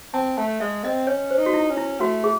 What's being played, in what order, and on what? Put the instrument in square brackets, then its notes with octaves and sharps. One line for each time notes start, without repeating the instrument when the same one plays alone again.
[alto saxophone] C4 [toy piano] A5
[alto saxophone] A3 [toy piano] A5
[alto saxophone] G#3 [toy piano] E5
[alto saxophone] C4 [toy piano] D#5
[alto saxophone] C#4 [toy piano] C#5
[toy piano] C5
[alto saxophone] D#4
[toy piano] F#4
E4
[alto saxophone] C#4
[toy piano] E4
[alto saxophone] A3 [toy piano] F#4
[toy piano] G#4